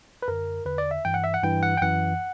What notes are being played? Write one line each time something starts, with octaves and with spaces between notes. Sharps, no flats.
B4
F#2 D3 A#4
E2 D3 B4
D5
E5
G2 E3 G5
F#5
E5
F#5
G2 E3 G5
F#5
G5
F#2 E3 F#5